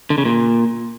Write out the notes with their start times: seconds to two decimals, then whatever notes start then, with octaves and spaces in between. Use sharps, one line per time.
0.10 D3
0.18 C#3
0.25 A#2